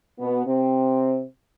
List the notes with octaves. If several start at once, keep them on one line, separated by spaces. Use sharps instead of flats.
B2 B3
C3 C4